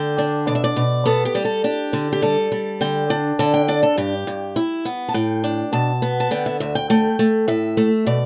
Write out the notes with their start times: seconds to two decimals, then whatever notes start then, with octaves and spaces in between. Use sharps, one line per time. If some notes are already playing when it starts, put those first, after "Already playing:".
Already playing: D3 G5
0.18 D4
0.47 B2 D5
0.55 E5
0.64 D5
0.76 B2
1.06 B3 A4
1.25 G4
1.35 G3
1.45 A4
1.64 D4 G4
1.93 D3
2.13 G4
2.22 G3 A4
2.52 G3
2.81 D3 G5
3.10 D4
3.39 D3 A5
3.54 G5
3.68 D4 D5
3.83 A4
3.97 G2 G4
4.27 G2
4.56 E4
4.85 B3
5.09 A5
5.14 A2 G5
5.44 D4
5.73 B2 A5
6.02 B3
6.20 A5
6.31 D3 G5
6.46 E5
6.60 D2 E5
6.75 G5
6.90 A3 G5
7.19 A3
7.48 A2 E5
7.77 A3
8.07 B2 D5